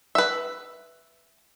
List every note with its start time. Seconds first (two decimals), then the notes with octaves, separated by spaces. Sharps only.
0.15 B4 E5